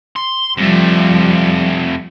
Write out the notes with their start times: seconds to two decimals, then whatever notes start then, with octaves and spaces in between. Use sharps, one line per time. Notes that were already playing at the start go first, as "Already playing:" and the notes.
0.16 C6
0.58 F2 F3 G3 A3